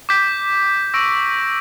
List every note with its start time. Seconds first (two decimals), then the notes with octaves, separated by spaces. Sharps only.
0.09 D6 G6 B6
0.94 C#6 E6 A#6 D7